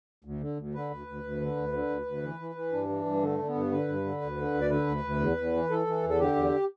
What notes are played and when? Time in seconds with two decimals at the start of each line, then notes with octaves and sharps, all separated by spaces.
0.24 D2
0.41 D3
0.58 D2
0.74 D3 B4
0.91 D2
1.07 D2
1.24 D2
1.40 D3
1.57 D2
1.73 D3
1.90 D2
2.06 D2
2.23 E3
2.39 E3
2.55 E3
2.72 G2 D4
2.89 E3
3.05 G2
3.22 D3 A3
3.39 D3
3.47 B3
3.55 G2
3.72 D3 B4
3.88 G2
4.04 D3
4.22 D2
4.37 D3
4.54 D2
4.61 D5
4.70 D3 B4
4.87 D2
5.04 D2
5.20 E2
5.37 E2
5.53 E3
5.70 E3 A4
5.87 E3
6.03 E2
6.09 A4
6.19 D3 G4
6.36 E2